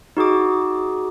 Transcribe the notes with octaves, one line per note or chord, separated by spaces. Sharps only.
D#4 F#4 G#4 D6